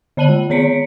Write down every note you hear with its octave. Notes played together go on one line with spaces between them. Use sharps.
D3 D5 A5 D#7 F#7
G#3
D#3 B3 C#5 B6 C#7 D7